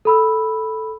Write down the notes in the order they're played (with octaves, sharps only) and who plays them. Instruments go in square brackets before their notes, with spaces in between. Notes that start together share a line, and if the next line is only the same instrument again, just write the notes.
[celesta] A4 B5 E6